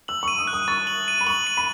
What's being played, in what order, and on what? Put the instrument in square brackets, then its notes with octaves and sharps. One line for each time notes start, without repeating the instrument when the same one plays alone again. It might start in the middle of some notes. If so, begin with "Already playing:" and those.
[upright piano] E6 [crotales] F#7
[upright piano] C#6
[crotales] D#7
[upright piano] D#6
[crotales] F#6
[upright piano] D#6
[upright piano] C#6 [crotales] A6
[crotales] F#7
D#7
[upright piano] B5
[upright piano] C#6 [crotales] F#7
[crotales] D#7
[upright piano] B5